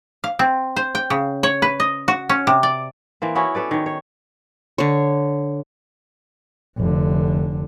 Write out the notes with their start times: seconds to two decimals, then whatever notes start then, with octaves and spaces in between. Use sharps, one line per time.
0.24 F5
0.39 C4
0.76 C5
0.95 G5
1.10 C#3
1.43 C#5
1.62 B4
1.80 D#5
2.08 F#4
2.29 C#4
2.47 C3
2.63 D5
3.22 E3 A#3 C4
3.35 B3 C#4 E4 F#4
3.55 C#4 A4 B4 D5
3.71 D#3 C#5
3.86 C#5
4.78 D3 C#5
6.78 F1 D3